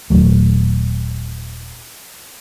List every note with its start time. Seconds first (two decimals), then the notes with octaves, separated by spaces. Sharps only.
0.10 D#1 C2 F#3 A3